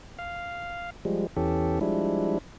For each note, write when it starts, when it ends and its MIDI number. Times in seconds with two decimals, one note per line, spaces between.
0.19 0.90 77
1.05 1.27 53
1.05 1.27 55
1.05 1.27 56
1.37 1.79 40
1.37 1.79 52
1.37 1.79 61
1.37 1.79 67
1.37 1.79 69
1.81 2.38 53
1.81 2.38 55
1.81 2.38 56
1.81 2.38 62
1.81 2.38 64